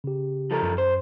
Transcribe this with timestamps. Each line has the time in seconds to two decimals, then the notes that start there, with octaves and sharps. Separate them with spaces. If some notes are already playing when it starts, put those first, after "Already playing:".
0.04 C#3 G4
0.51 F3 A4 A#4
0.63 F#2
0.78 C5